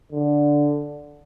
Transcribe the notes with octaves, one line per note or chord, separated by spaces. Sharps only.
D3